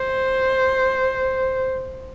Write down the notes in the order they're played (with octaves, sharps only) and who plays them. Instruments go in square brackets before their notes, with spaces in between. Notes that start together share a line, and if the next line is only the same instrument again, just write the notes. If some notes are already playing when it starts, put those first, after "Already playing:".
Already playing: [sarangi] C5